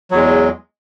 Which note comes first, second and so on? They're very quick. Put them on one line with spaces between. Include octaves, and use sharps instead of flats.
F#3 E2 G#3